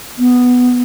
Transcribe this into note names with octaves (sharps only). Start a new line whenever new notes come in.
B3